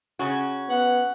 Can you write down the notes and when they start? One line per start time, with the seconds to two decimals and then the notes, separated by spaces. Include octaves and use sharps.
0.19 C#3 C#4 F#4
0.69 B3 F#5